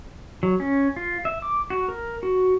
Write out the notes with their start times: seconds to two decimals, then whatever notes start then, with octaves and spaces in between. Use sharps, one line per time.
0.43 F#3
0.60 C#4
0.96 F4
1.25 E5
1.42 D6
1.70 F#4
1.89 A#4
2.23 F#4